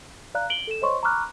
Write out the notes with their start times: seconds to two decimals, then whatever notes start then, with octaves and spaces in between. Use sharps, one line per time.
0.35 D5 F5 A#5 F#6
0.50 D7 F#7 G7
0.67 A4 E7
0.82 C5 C#5 D#5 C6 C#6
1.03 A#5 B5 C#6 D6 F6 F#6